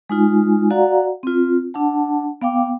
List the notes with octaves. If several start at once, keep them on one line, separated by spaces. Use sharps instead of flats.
G#3 D#4 F4 G#5
F#4 D5 F5 F#5 A#5
C4 F4
D4 F#5 A5
B3 F5 G5 D6